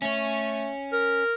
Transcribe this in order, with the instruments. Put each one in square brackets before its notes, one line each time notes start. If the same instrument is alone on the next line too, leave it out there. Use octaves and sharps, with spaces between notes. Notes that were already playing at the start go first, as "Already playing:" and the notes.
[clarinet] A3 [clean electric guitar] C#4 C#5
[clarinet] A#4